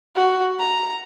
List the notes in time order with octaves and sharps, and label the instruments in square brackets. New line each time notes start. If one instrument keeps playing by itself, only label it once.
[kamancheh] F#4
A#5